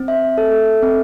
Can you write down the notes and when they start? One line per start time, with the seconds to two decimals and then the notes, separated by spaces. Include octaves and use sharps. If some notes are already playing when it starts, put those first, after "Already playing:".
Already playing: C4
0.08 E5
0.38 A4
0.82 C4